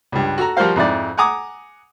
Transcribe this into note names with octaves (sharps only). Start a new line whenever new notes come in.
C#2 G2
F#4 A4 A#5
F3 G3 F#4 A#4 C5 F5
F2 G#2 E4 D5
F#5 G#5 A#5 D6 D#6